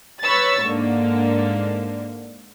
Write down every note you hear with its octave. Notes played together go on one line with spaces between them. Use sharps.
B4 C#5 B5 C#6 E6 A6
G#2 D3 A#3